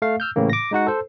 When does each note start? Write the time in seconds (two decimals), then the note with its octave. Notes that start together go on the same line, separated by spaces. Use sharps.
0.02 A3 F5
0.20 E6 F6 G6
0.36 A2 C#3 E3 A#3
0.50 D6 A#6
0.71 G#3 D#4 F#4 F#5
0.87 A4 C5